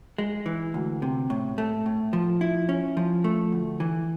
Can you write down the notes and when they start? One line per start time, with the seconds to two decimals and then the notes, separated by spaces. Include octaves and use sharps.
0.18 G#3
0.46 E3
0.74 D2
1.02 C3
1.30 A2
1.58 A3
1.86 A2
2.13 F3
2.41 E4
2.69 C#4
2.97 F3
3.24 A3
3.52 D2
3.80 E3